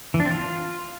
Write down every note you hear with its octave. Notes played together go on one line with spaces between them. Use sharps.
E3
D4
C4
F4